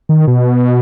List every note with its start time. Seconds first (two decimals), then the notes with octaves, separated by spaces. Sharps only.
0.09 D#3
0.27 B2